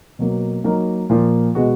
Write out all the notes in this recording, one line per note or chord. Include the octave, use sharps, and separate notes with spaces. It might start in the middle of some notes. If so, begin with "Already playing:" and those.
B2 F#3 A#3
F#3 A#3 D#4 A#4
A#2 F3 A#3
B2 G#3 B3 F#4